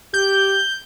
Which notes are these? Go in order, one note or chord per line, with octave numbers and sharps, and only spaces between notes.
G4 G6